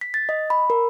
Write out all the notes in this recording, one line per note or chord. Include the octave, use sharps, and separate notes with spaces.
B6
A6
D#5
B5
A#4